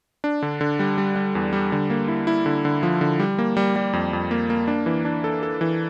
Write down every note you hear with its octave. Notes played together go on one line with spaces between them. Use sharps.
D4
D3
D3
G3
G3
G3
E2
G3
D3
A#3
E4
E4
D3
D3
F3
D3
G3
A#3
G3
G3
F2
F2
A#3
A#3
D4
E3
D4
A4
A4
E3